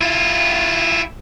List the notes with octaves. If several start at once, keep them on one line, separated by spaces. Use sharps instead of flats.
E4 F4